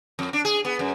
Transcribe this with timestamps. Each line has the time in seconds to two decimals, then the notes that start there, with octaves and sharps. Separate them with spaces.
0.19 F2
0.33 D4
0.45 G#4
0.65 B3
0.79 F#2